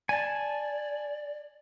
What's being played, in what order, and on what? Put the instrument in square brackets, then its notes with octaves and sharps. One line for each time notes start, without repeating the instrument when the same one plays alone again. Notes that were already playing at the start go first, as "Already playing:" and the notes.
[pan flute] D5 [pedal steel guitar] G#5 A5